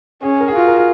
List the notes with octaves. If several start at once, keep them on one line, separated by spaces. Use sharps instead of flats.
C#4 G#4
A#4
G#4
F4 F#4
A#4
G#4